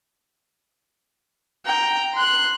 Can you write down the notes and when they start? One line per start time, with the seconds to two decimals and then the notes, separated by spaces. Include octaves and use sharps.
1.65 G5 A#5
2.14 C6 F#6